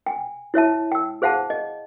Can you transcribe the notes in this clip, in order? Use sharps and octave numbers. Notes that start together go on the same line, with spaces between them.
G5 G#5
E4 C#5 E5 A5
G5 E6
G#4 C5 F5 F#5 A5
D#5